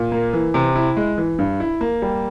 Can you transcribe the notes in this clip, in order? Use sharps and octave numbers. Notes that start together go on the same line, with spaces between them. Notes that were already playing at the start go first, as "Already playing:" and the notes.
Already playing: A#2
A#3
E3
C3
E4
G#3
E3
G2
E4
A#3
G3